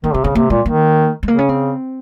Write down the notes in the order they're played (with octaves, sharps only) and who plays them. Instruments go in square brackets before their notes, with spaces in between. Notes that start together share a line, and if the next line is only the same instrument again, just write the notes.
[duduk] D#3 [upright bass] A#3
[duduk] C3 [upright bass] C4
[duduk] C#3 [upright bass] C4
[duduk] C3 [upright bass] A#3
[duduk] A#2 [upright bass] G#3
[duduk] D#3 [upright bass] A#3
[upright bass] G#3
[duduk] C#3 [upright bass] A#3
[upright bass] C#4
C4